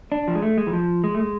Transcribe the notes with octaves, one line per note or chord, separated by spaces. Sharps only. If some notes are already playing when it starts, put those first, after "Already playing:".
D4
F3
G#3
A3
G#3
E3
F3
G#3
A3
G#3